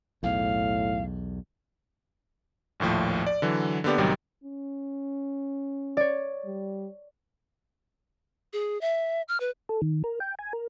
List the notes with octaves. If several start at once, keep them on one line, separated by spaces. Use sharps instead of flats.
B1 E2 A2 F5
A#1 D#2 A2 F3
D5
D3 E3 F#3
D3 A#3 B3 G4 D5
A1 C3 D#3 F#3 G3
C#4
C#5 D5
G3
G#4
E5
F6
B4
A4
D#3
A#4
G5
G#5
A#4